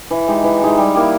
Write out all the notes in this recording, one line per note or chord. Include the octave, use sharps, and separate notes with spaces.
E3
G#3 D#4 G4
E3
G#3 D#4 G4
G3
A#3 E4 G4